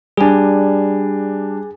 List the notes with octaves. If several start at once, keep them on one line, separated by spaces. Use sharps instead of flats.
G3 D4 G#4 G#5